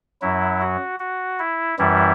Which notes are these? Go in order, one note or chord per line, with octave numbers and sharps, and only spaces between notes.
F#2 F#3 E4
F#4
F#4
E4
F#2 E3 G3 E4